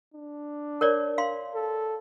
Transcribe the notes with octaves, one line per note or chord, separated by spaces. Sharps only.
D4
A#4 C#5 D5
F5 C6
A4